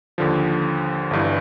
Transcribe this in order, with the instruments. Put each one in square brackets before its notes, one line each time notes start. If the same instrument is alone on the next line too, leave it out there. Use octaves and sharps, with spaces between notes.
[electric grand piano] D#2 D3 F3
G1 G2 E3